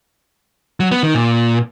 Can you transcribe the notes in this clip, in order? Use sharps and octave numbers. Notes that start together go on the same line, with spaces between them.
F#3
B3
D#3
A#2